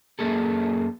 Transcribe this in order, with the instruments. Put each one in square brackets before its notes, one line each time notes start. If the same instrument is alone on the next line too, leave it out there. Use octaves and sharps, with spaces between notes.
[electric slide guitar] F#2 A#3 G#4 A4